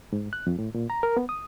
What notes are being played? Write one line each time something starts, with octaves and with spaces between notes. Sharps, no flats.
G#2
F#6
F2
A2
A#2
A#5
A#4
B3
D#6